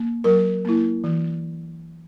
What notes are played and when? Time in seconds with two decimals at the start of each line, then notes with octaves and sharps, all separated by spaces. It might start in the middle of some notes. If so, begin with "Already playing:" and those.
Already playing: A#3
0.24 F#3 A#4
0.65 A#3 E4
1.04 E3